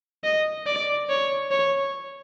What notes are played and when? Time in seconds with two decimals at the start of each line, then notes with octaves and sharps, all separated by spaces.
0.24 D#5
0.66 D5
1.09 C#5
1.51 C#5